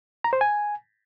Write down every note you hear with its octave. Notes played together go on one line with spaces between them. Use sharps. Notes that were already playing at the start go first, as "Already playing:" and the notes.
A#5
C5
G#5